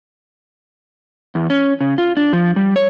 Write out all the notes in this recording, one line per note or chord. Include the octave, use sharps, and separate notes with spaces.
E2
C#4
C#3
F4
D4
F3
G3
C#5